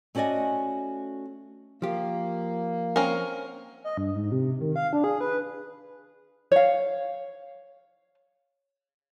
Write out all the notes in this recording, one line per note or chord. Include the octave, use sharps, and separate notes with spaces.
A3 C#4 F#4 D5 D#5 G#5
F3 A#3 G4
C4 C#4 A#4
D#5
G2
G#2
C3
D#3
F5
D4
G#4
B4
C#5 F5